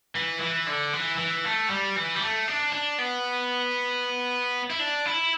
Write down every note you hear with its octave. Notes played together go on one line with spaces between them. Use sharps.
E3
E3
D3
E3
E3
A3
G3
E3
G3
A3
D4
D4
B3
E4
D4
E4